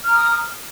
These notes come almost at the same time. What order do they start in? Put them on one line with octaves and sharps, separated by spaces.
F6 A#5 D#6